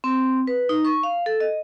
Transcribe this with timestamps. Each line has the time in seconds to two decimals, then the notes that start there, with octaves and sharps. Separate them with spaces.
0.04 C4
0.47 B4
0.69 D#4
0.85 C#6
1.03 F5
1.26 A4
1.40 D#5